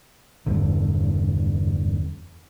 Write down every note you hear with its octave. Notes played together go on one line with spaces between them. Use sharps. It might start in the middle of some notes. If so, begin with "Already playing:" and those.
F1 E2 G2 D3